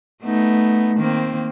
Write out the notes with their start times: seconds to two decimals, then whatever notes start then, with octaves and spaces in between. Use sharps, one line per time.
0.22 A3 B3 D#4
0.97 D#3 A#3 C4